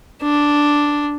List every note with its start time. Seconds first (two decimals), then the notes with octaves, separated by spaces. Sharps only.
0.22 D4